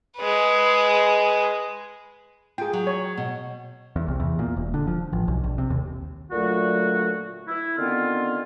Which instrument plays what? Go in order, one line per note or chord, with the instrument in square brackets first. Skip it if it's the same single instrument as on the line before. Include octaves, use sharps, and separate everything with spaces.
[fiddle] G#3 B4
[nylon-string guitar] F4 [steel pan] G#4 G5
[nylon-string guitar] F#3
[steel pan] C#5
[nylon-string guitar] B2
[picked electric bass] E2
C2
E2
A#2
E1
D3
F3
A1
B1
A#1
C3
D#2
[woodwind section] A#2 D3 F#3 A3 F#4
E4
D3 D#3 B3 C4 F4